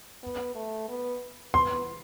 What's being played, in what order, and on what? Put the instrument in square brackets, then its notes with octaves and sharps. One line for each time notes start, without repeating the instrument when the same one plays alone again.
[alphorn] B3
A3
B3
[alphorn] B3 [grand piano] C6